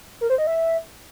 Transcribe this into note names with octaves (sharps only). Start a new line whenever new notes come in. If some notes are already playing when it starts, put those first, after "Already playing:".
A#4
C5
D#5
E5